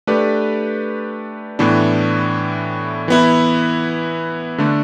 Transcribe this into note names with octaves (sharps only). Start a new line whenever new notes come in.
A3 D4 G4 B4 D5
A2 E3 B3 D4
E3 B3 E4
D3 A3 D4